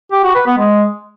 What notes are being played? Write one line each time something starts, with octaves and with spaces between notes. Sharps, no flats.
G4
F#4
B4
B3
G#3